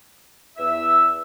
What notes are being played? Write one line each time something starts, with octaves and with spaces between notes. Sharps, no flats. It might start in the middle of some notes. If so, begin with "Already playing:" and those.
E2 E5 E6